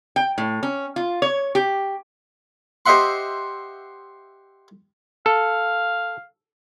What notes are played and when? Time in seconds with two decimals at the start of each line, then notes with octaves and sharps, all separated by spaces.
0.16 G5
0.38 A2
0.63 C#4
0.96 F4
1.22 C#5
1.55 G4
2.86 G4 C5 D#5 E5 F#5 C6
5.26 A4 F5